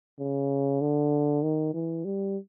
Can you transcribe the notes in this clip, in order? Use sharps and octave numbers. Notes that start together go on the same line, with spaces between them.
C#3
D3
D#3
E3
G3